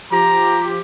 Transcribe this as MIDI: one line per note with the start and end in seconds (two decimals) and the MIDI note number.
0.12 0.81 53
0.12 0.81 67
0.12 0.64 82